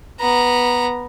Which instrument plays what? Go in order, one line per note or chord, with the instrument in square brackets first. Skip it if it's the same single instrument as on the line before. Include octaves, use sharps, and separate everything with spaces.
[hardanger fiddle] B3 A#5